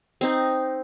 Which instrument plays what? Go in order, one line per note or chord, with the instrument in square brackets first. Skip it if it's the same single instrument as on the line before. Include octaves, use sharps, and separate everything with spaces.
[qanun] C4 D#4